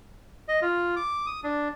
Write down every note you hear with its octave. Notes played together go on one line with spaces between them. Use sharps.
D#5
F4
D6
D#6
D4